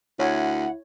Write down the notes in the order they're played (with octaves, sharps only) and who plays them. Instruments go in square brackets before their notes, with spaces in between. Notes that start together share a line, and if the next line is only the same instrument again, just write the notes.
[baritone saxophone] D2 [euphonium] E4 [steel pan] C#5 [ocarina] F#5